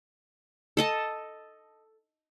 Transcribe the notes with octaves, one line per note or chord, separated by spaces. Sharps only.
A4 D#5 A5